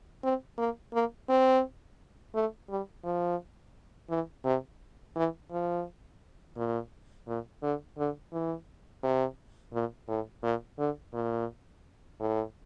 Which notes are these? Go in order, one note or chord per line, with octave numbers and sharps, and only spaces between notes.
C4
A#3
A#3
C4
A3
G3
F3
E3
C3
E3
F3
A#2
A#2
D3
D3
E3
C3
A#2
A2
A#2
D3
A#2
A2